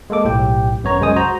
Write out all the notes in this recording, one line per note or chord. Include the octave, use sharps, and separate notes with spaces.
G#3 A#3 A4 D6
B1 A2 G4 G5
G#1 F#2 B3 C#5 A#5
C2 F#2 G#3 C5 G#5 D#6
F#4 C5 A#5